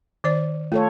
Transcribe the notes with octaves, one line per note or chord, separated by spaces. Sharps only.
D#3 C5 D5
A3 F4 A4 C#5